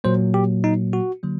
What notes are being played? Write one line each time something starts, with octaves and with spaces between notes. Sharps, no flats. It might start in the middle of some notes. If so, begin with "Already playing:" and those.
A#2 F#3 A#3 C5
G4
D#4
F#4
D3 F#3 A#3